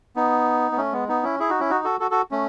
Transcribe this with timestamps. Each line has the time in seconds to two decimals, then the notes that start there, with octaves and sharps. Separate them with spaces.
0.16 B3 D#4
0.72 B3
0.77 A3 C#4
0.93 G#3 B3
1.08 B3 D#4
1.23 C#4 E4
1.39 E4 G#4
1.49 D#4 F#4
1.60 C#4 E4
1.70 D#4 F#4
1.85 F#4 A4
2.00 F#4 A4
2.11 F#4 A4
2.31 A3 C#4